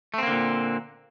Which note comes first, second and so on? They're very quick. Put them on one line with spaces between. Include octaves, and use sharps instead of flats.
A3 C4 A#3 D3 A#2